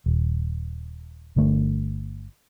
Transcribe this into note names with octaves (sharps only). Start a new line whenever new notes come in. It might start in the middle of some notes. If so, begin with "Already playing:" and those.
D#1
G1 D3 A3